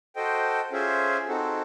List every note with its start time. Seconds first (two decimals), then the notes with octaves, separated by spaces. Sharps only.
0.16 F#4 A4 C5 D#5 G5
0.72 C#4 F4 G#4 C5 E5
1.28 C4 D#4 F#4 A4